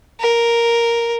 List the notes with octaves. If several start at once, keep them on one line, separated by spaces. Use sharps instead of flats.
A#4